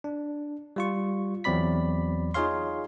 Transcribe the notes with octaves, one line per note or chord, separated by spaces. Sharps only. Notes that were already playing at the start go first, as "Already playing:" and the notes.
D4
G3 F4 C#6
E2 F#3 C4 D5 B5 B6
D#4 F4 G#4 C#5 F5 C6